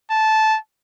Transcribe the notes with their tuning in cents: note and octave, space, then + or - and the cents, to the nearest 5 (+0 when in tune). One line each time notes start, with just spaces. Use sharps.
A5 -10